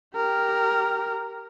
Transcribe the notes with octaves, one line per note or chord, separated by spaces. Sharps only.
G4 A#4